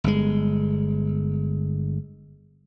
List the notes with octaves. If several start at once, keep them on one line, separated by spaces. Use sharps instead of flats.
G1 G#3